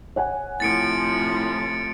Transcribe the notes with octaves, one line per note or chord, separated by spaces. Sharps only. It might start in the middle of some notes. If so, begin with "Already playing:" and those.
C#5 F#5 G#5
A2 C3 F3 E4 A6 C#7 D7